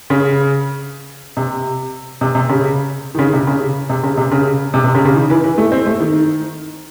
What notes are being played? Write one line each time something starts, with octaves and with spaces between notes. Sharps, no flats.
C#3
C3
C3
C3
C#3
D#3
C#3
C3
C#3
C3
C#3
C3
C#3
C3
C3
C#3
C#3
D#3
E3
E3
A3
C4
A3
D#3